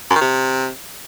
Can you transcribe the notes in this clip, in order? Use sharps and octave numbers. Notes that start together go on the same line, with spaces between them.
F#2
D#3
C3